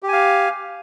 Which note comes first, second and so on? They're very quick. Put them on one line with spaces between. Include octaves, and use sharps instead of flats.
G4 G#5 F5